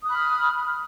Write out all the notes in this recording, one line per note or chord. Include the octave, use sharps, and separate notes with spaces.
B5 D#6 F6 F#6